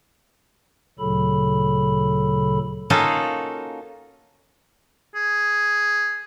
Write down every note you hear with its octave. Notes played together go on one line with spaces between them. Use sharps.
D2 A#2 C#3 F#3 A4 B5
A#3 C#4 D#4 F4 F#4 A4
G#4